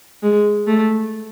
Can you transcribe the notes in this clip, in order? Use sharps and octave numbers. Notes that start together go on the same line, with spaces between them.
G#3
A3